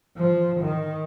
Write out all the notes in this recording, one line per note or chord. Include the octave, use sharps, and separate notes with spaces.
F3
D#3